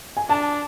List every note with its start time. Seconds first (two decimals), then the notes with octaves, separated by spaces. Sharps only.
0.17 G#5
0.29 D4 A5